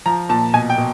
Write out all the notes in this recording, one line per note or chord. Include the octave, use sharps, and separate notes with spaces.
F3 A#5
A#2 A5
B2 G#5
G5
B2